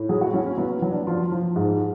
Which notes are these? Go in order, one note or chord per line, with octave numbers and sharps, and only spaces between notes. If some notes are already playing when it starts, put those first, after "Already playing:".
Already playing: A2
F#3 G#4
F#4
F#3 C#4
C#4
F#3 B3
F#3
D4
F3 F4
F3
G#2